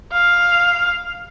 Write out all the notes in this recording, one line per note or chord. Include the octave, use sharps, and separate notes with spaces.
F5